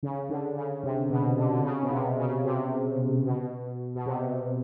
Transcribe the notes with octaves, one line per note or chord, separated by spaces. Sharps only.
C#3
D3
C#3
C3
B2
D3
D3
C#3
B2
C3
C#3
C3
B2
B2
C3